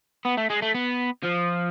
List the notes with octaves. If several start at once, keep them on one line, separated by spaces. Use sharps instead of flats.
B3
A3
G#3
A3
B3
F3